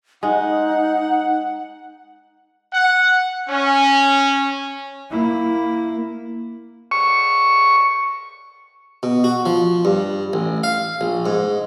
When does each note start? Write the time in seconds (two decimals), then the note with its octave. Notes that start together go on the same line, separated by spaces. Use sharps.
0.23 G#3 D#4 F#5
2.73 F#5
3.49 C#4
5.10 A#3 E4
6.91 C#6
9.03 B2
9.24 F#4
9.46 F3
9.85 G2
10.33 A1
10.64 F5
11.01 A#1
11.26 G#2